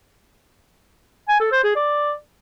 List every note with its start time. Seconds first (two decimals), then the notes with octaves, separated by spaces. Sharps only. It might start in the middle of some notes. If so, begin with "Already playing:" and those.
1.28 G#5
1.40 A4
1.52 C5
1.64 G#4
1.75 D5